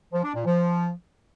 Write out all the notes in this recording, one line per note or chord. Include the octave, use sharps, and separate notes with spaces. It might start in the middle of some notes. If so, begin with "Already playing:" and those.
F3
D4
A#2
F3